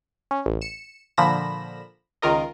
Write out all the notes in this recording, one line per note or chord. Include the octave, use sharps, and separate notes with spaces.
C#4
A1
C#7 E7
A#2 D3 F3 B5 A#6 E7
C#2 D#3 F4 A#4 D#5